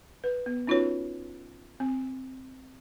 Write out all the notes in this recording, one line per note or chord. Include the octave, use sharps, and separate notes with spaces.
B4
B3
C#4 D#4 F4 F#4 B4 C#5
C4